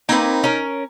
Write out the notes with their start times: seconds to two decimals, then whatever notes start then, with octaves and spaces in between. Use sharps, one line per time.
0.09 A#3 C4 D#4 B4
0.44 C#4 A#4